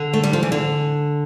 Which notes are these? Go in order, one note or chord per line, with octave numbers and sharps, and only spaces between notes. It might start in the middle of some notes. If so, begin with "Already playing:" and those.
Already playing: D3
A3
G3
F3
E3
D3